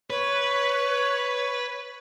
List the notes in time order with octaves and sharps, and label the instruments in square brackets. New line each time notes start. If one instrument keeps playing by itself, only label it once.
[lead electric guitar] B4 [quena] C#5